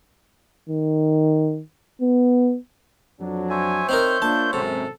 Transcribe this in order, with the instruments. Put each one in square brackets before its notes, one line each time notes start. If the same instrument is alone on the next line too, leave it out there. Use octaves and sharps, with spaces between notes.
[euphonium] D#3
B3
[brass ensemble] F2 F#3 D4
[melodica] C5 C#5 E5 [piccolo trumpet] G#5
[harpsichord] C4 D#4 A#4 [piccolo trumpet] G6
[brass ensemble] A#3 D4 F4 [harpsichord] A5
[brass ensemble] G#1 F#2 [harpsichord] C3 [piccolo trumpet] A4